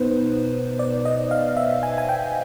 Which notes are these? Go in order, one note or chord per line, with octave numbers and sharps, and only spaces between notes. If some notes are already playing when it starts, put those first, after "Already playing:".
Already playing: B2 B3 D#4 B4 C5
D5
D#5
F5
E5
G#5
G#5
G5